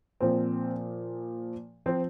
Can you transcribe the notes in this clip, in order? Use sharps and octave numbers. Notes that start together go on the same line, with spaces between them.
A#2 F3 C4
F3 C4